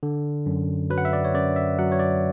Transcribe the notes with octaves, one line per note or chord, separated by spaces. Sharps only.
D3
F#2
F#3 B4
F#5
E5
D5
C#5
F#2 D5
E5
F#3 F#5
C#5
D5